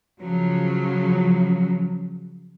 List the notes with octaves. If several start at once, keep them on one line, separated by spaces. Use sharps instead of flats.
C#3 F3 F#3